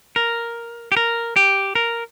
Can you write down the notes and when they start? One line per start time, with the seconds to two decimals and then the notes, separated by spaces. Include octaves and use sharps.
0.16 A#4
0.92 G4
0.97 A#4
1.36 G4
1.75 A#4